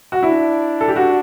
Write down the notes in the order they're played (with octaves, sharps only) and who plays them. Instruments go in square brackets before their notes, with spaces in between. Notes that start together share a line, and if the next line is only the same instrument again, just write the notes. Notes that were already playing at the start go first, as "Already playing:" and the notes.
[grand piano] F#4
[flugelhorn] D4 [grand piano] E4
[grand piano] A4
G4
F#4